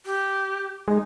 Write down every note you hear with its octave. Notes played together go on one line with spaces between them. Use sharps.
G4
G#3 D#4